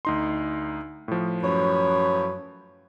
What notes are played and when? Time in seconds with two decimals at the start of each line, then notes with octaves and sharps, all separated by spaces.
0.05 D2 D#4 C6
1.08 A2 F3
1.43 F#2 B4 C#5